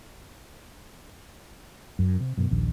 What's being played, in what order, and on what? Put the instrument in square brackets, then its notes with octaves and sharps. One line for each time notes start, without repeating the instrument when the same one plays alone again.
[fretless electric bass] F#2
C3
F#2 B2
A#1 D#2